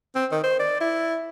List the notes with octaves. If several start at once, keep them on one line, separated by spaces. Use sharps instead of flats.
C4
D#3
C5
D5
E4